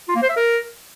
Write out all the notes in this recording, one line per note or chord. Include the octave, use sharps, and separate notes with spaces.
F4
A#3
C5
E5
A#4